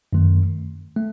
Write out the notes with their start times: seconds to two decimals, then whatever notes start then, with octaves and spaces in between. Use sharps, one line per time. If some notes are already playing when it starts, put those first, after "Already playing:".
0.13 F#2 D#3 A3
0.96 A3